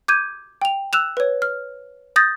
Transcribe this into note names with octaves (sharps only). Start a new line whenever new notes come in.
D6 G6 G#6 D#7
G5 F7
E6 F#6 E7 F7
B4 C#5
F6
D#6 G6 A6 A#6